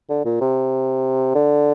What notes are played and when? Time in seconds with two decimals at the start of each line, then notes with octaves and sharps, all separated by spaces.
0.09 D3
0.25 A#2
0.41 C3
1.35 D3